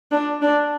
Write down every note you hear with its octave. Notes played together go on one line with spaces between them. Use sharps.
D4
D4